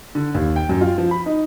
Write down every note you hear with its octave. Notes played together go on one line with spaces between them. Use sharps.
D3
D#2
G5
F#2
F4
F3
B5
D#4